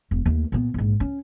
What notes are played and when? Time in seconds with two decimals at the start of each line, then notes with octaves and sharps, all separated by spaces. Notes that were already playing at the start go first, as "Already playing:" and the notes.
0.11 E1
0.26 D#2 A3
0.52 A#2 B3
0.74 A#1 G#2
1.00 C#4